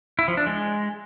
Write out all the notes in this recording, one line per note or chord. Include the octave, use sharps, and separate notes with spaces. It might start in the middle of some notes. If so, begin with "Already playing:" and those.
E4
F3
D4
G#3